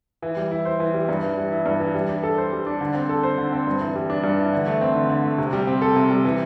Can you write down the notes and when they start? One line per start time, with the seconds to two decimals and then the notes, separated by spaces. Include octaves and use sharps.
0.22 E3
0.37 G3
0.51 E4
0.65 C5
0.80 E3
0.94 G3
1.09 G2
1.23 E3
1.37 G3
1.51 E4
1.66 G2
1.80 E3
1.94 G3
2.09 D4
2.23 A4
2.38 C5
2.52 G3
2.66 D4
2.81 D3
2.95 C4
3.09 A4
3.23 C5
3.38 D3
3.52 C4
3.67 G2
3.81 E3
3.95 G3
4.10 D4
4.24 G2
4.38 E3
4.53 D3
4.67 A3
4.81 C4
4.95 D3
5.10 D3
5.24 A3
5.38 C3
5.53 G3
5.67 C4
5.82 A4
5.96 C3
6.10 G3
6.25 E3